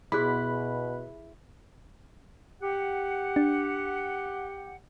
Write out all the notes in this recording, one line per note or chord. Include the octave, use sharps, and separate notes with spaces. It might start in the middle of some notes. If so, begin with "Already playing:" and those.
B2 E4 F#4 G#4 B5 D6 F#6
G4 F#5
D4